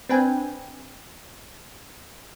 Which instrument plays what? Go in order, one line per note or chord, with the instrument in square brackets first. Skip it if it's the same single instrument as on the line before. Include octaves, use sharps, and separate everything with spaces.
[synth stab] C4 D4 B4 G5 G#5